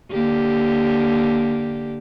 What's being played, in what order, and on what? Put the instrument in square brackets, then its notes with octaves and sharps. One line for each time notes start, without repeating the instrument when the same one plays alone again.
[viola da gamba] D3 A#3 G4